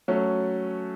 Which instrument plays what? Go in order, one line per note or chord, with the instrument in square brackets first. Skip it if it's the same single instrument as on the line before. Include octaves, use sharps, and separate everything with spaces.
[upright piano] F#3 A3 C#4